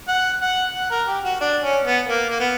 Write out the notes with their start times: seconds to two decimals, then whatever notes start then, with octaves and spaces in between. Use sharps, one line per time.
0.08 F#5
0.42 F#5
0.74 F#5
0.91 A#4
1.08 G4
1.24 F#4
1.41 D4
1.63 C#4
1.85 B3
2.07 A#3
2.30 A#3
2.40 B3